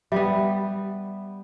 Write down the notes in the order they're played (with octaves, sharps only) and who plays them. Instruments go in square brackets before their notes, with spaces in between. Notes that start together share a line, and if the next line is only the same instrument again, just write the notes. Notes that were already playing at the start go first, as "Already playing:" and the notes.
[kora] G3 B3 [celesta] E5